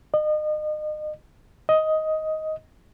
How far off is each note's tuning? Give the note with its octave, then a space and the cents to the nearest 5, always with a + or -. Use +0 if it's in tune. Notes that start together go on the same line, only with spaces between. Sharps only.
D#5 -35
D#5 +10